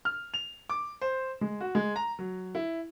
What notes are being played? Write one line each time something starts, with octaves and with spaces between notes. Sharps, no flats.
F6
F7
D6
C5
G#3
F#4
G#3
A#5
F#3
E4